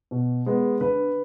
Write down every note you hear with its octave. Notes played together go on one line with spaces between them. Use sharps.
B2
G#3 B3
D3 B4